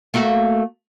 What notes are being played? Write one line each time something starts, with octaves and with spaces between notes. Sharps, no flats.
A3 A#3 F#4